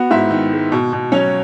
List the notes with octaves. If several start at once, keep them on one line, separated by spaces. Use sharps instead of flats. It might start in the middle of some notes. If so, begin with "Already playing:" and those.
Already playing: B3 F#4 F#5
G#2 E4 E5
D#3
G#3
B2
B2
F#3 C#4 C#5